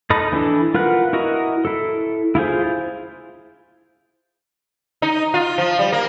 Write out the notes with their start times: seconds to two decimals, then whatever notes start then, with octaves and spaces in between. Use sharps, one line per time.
0.10 D#4 A4 D#5 B5 D#6
0.32 E3 D4 E4 A4
0.75 F4 A#4 B4 F#5
1.13 E4 F#4 A#4 D#5
1.65 E4 A4
2.35 E4 F4 G#4 C5
5.02 D#4
5.34 F4
5.58 F3
5.79 G3
5.92 A#3